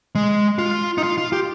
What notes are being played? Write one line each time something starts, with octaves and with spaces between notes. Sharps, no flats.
G#3
F4
D#4
F4
F4
G4